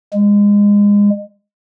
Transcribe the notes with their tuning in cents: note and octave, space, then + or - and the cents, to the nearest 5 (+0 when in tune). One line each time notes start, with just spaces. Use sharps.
G#3 -25